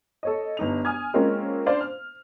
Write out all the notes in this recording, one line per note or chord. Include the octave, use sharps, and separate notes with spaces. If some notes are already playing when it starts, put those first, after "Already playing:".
A4 C#5 D#5
G1 D#4 F7
G#5 D#6 F6 G#6
G#3 A#3 C4 C#4 F4
D4 C5 D5 F5
F6